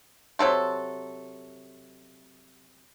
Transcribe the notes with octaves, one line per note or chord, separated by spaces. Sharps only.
C3 F#3 A4 C6